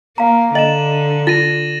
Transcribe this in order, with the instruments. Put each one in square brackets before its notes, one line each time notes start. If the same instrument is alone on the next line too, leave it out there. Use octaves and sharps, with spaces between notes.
[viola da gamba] A#3 [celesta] F5 A#5
[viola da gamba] D3 [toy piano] D#5 [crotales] E7 F#7
[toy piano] F4 [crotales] A6 A#6 D#7